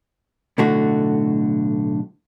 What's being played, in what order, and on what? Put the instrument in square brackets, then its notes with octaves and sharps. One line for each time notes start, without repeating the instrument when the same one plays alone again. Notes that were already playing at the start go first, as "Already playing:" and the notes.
[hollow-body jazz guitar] B1 A2 D3 A3 F#4